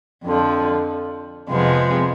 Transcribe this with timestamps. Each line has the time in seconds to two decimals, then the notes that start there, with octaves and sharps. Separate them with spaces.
0.24 F2 D3 F3
1.50 F2 C3 F3 G#3 B3